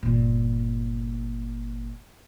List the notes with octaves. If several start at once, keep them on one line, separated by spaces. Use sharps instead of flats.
G1 A#2